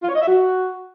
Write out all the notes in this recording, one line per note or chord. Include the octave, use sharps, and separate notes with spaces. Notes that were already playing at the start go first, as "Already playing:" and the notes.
F4
C#5
D#5
E5
F#4